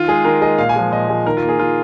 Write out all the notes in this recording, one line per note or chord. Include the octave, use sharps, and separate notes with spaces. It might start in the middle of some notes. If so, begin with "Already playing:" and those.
Already playing: D#3 F4
G#3 G#4
D#3 A#4
G#3 D#5
A#2 F5
G#5
F3 G#3
A#2 D#5
F3 G#3
D#3 A#4
F4
A#3
G#4
D#3 F4